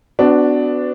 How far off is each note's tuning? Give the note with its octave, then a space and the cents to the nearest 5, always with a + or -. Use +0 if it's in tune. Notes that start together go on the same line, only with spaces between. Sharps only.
B3 +35 D4 +0 F#4 +0